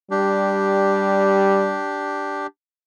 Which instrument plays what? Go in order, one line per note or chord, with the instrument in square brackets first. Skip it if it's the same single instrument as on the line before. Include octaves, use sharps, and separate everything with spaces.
[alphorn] G3 [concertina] D4 G4